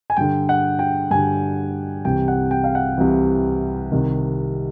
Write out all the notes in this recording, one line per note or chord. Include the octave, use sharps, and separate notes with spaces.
G#5
G2 D3 G5
F#5
G5
G2 D3 G#5
C2 C3 E3 G5
F#5
G5
F5
F#5
C2 C3 E3
C2 C3 D#3